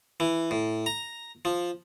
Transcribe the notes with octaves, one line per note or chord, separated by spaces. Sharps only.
E3
A2
A#5
F3